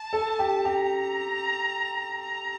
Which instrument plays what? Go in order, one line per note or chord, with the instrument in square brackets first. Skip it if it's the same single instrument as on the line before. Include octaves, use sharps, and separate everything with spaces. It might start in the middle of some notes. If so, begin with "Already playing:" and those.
Already playing: [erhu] A5
[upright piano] A4
G4
[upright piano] G4 [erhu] A#5
[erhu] A#5